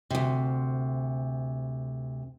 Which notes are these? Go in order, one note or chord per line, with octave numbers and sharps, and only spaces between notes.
D2 C3